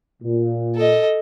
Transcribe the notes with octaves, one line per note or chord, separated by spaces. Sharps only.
A#2
A4 D#5